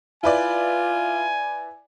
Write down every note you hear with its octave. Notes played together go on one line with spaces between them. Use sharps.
E4 F4 B4 D5 G#5